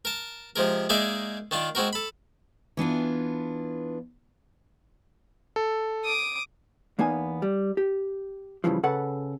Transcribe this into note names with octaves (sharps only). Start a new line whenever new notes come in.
A#4 A5
C3 F3 G#3 A#4
G#3 A#3 D#4 G#4 D5 E5
D#3 D4 F4
G#3 C4 F#4 A#4
A4 B5
E3 B3 D4 F4
A4
D6 D#6
E2 A#3 B3 D#4 G#5
G3
G4
G2 C#3 E3 F3
C#3 A4 B4 F#5